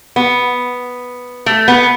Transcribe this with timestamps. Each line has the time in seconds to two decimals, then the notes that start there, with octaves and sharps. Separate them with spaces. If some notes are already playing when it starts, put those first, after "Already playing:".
0.16 B3
1.46 A3
1.68 B3